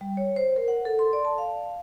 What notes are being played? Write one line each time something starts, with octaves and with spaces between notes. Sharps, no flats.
G3
C#5
C5
A#4
F#5
A4
C6
D5
A5
F5